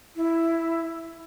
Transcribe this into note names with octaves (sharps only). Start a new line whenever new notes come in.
E4